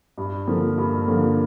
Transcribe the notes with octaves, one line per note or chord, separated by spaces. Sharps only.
G2
D3 F3 A#3
G2
D3 F3 A#3